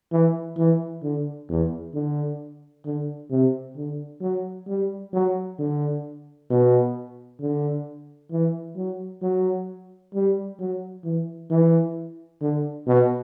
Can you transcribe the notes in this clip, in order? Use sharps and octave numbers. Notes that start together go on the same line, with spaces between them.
E3
E3
D3
E2
D3
D3
C3
D3
F#3
G3
F#3
D3
B2
D3
E3
F#3
F#3
G3
F#3
E3
E3
D3
B2